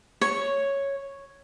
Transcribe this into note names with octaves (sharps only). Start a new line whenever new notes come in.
C#5